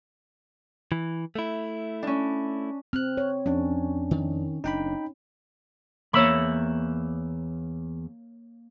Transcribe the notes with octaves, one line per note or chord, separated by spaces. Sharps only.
E3
A3 E4
C#4 D4
C4 F6 F#6
C#5
F2 C#4 D4
D#3
F#1 D4 D#4 G5 B5
E2 A#3 C#5 E5 B5